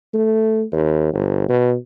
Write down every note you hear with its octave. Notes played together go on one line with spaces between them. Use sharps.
A3
D#2
G1
B2